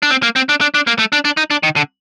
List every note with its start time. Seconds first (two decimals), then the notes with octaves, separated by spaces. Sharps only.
0.02 D4
0.10 C4
0.23 A#3
0.36 C4
0.49 D4
0.61 D4
0.74 D4
0.87 A#3
0.99 A3
1.12 D4
1.25 D4
1.37 D#4
1.51 D4
1.63 D#3
1.76 D3